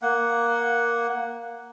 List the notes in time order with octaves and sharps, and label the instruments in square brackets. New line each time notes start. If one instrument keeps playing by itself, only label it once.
[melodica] A#3 F#5